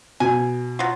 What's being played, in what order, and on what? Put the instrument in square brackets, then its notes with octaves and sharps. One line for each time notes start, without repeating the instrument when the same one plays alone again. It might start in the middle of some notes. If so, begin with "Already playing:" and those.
[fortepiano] B2 [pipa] G#5
[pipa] F#3 F4